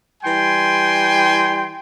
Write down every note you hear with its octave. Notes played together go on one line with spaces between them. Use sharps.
E3 G3 G5 G#5 C6